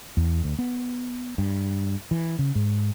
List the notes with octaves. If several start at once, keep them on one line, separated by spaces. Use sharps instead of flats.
E2
D2
B3
G2
E3
C#3
G#2